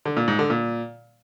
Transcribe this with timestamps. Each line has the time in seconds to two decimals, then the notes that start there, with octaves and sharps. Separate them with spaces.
0.05 D3
0.17 A#2
0.28 G#2
0.39 D3
0.50 A#2